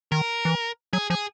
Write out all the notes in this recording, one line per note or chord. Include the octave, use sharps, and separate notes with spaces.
D#3 A#4
E3
F#3 G#4
F3 G#4